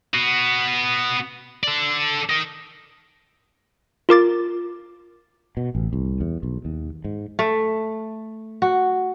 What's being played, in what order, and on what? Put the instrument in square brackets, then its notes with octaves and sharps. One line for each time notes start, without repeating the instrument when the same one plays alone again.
[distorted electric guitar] B3 F#4
A4 D5
A#4 D#5
[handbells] F4 A#4 D6 A6
[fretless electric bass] B2
A1
C2
E2
B1
D#2
G#2
[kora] A3
F#4